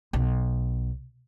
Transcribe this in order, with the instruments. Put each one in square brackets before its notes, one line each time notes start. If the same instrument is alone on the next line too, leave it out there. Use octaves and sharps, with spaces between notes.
[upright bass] B1